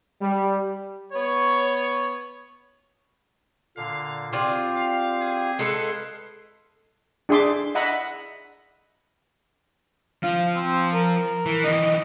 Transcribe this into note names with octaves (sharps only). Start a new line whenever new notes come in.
G3
B3 C#5
A#2 D3 F5
C4 F4 G4 G#4 D5
F5
G#4
G#3 A4 B4 F5 C6
D4 G#4 E5 C6 D6
D#5 E5 F#5 A#5 B5
F3 F4 F5
C4
A#4
E3
E3 D#4 D#5